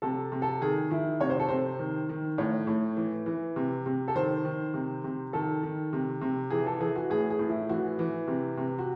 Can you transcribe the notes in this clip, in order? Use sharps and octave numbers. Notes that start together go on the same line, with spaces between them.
C3 A4
C3
A4
D#3 G#4
D#3 E4
C3 C#5
C5
A4
C3 C5
D#3
D#3
A2 C#5
A2
E3
E3
C3
C3
A4
D#3 C5
D#3
C3
C3
D#3 A4
D#3
C3
C3
E3 G#4
A4
E3 G#4
F#4
A2 G#4
G#4
A2
E4
E3 F#4
E3
C3
C3
F#4